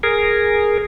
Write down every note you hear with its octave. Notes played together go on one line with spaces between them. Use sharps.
G#4 A#4